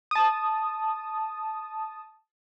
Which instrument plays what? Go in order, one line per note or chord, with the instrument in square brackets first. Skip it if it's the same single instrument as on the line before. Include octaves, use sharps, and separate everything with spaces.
[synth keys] A5 D#6